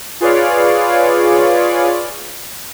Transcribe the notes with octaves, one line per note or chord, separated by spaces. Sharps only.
F4 G#4 B4 C#5 D5 F5